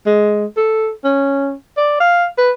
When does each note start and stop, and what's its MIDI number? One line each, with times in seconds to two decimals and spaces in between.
0.06 0.45 56
0.57 0.89 69
1.04 1.53 61
1.77 1.98 74
2.00 2.26 77
2.38 2.51 71